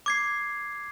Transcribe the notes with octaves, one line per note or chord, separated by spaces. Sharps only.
D6 G#6 C7